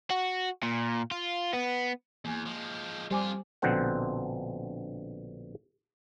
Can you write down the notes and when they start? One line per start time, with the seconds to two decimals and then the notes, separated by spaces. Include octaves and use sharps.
0.11 F#4
0.63 A#2
1.11 F4
1.53 B3
2.25 E2 A#3 G#5
2.46 F3 G#3
3.11 F2 G3 F4 C5 G#5 D6
3.62 A#1 B2 D3 C4 C5 F#5